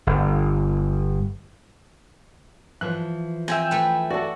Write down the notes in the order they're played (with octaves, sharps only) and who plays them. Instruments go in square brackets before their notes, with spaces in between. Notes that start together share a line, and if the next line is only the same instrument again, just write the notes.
[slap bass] G1
[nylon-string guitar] E3 F3 [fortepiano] F#6
[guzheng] C4 [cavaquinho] E5 G5 G#5
[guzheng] A3 B4
[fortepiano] F#4 A4 [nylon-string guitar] D5 F#5